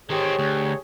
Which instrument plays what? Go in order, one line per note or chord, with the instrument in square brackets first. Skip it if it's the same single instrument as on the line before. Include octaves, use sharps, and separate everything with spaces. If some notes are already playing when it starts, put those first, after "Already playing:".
[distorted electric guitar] D#3 C4 [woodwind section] G4 G#4 C#5
[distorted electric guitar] D2